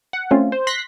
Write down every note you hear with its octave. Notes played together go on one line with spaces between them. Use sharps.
F#5
A3 C4 C#4 F4
C5
C6 F#6 A#6 B6